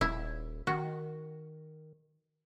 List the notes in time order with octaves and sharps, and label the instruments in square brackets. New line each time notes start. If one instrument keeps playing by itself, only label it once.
[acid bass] D#1 [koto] E4
[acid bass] D#3 [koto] F#4